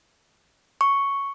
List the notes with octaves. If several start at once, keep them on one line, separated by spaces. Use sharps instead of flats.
C#6